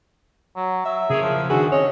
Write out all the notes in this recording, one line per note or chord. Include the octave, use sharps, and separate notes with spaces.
F#3
F#3 E5
C#3 G#4 A#4 C#5
F3
D#3 D4 F#4 G#4 B4
C4 C#4 C#5 D#5